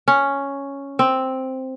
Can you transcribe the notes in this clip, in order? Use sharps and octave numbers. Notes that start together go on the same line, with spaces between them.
C#4
C4